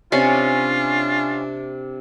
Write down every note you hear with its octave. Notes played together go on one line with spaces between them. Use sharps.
C3 C#4 D4 F4 D5 C6